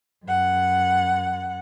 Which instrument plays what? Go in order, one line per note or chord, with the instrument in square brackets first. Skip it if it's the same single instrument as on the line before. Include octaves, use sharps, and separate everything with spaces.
[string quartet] F#2 F#5